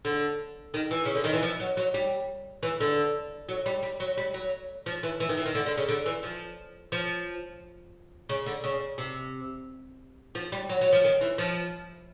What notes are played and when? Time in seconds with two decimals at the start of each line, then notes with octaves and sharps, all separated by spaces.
0.05 D3
0.74 D#3
0.91 E3
1.05 C#3
1.15 D3
1.24 D#3
1.33 E3
1.43 F3
1.60 F#3
1.77 F#3
1.94 G3
2.63 E3
2.80 D3
3.49 F#3
3.66 G3
3.83 G3
4.00 F#3
4.17 G3
4.34 F#3
4.86 F3
5.03 E3
5.20 E3
5.29 D#3
5.37 E3
5.46 D#3
5.55 D3
5.66 D3
5.77 C#3
5.88 D3
6.06 E3
6.23 F3
6.92 F3
8.29 C#3
8.46 D3
8.64 C#3
8.98 C3
10.35 F3
10.52 G3
10.69 F#3
10.81 F#3
10.93 F3
11.04 D#3
11.21 E3
11.38 F3